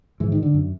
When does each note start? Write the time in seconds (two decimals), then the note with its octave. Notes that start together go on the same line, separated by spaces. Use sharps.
0.20 G#2 E3
0.32 D#3
0.43 D3
0.54 F#2